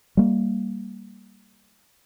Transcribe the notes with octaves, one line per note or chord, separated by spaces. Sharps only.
G3 A#3